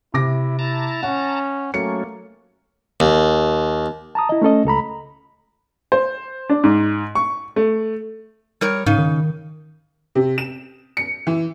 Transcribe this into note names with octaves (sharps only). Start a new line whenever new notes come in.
C3 E4 D6 A#6
E4 A5 A#5
C#4 F#5
F#3 A3 A#3 C#4 C#7
D#2
A5 A#5 D#6
E4 D#5
A3 C#4 A4 D#5
C#2 A4 A#5 B5
C5
D4
G#2
C#6
A3
G3 A#4 C#5
G#2 C#3 D#4
D#3
C3
E7
C#7
E3